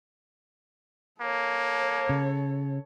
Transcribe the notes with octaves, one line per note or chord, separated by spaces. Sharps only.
A#3 A4 C#5
C#3